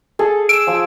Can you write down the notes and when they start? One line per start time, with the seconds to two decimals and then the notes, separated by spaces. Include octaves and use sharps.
0.19 G#4 A4
0.49 E6 D7
0.67 F3 G#5 D#6